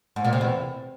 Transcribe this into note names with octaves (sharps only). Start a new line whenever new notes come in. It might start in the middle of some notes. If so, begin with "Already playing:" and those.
G#2
A#2
C3
E2